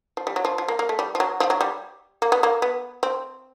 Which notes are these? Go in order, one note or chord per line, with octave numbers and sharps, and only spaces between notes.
F3
G3
F#3
F3
F3
A#3
A#3
A3
G3
F3
F#3
F3
F#3
G3
A#3
B3
A#3
B3
C4